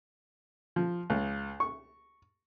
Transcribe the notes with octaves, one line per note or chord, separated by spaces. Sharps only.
F3
C#2
C#6